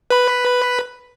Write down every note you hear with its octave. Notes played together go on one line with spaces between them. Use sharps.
B4 B5